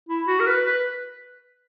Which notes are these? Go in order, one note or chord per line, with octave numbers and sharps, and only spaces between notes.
E4
F#4
A#4
B4
B4